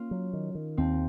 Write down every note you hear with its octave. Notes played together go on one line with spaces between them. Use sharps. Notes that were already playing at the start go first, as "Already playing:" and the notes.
Already playing: A#3 C#4 F4
F#3
D#3
D#3
D#2 C4